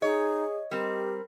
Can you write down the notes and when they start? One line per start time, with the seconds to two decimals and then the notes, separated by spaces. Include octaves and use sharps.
0.02 D#4 G#4 C#5 D#5
0.71 G3 C4 G4 A#4